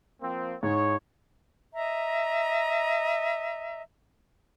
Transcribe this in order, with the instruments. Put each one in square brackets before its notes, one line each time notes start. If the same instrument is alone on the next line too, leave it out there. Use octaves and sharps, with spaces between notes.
[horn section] F3 A#3 C4
[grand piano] G#2 [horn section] E4 G#4 C#5
[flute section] D#5 E5 A#5